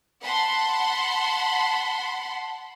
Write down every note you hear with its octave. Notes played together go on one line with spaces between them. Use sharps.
F#5 A5 B5 C6